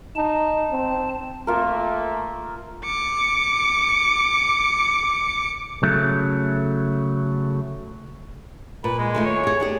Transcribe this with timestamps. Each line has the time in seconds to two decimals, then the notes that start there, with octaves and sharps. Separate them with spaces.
0.16 D#4 A5
0.71 C4
1.47 A3 A#3 F4 A#4
2.85 D6 C#7
5.83 C#3 F#3 A3
8.84 A#2 B4
8.99 G#3
9.15 D#3 A3 A#3
9.26 C#5
9.44 G4 G#4
9.60 D4 G4 G#4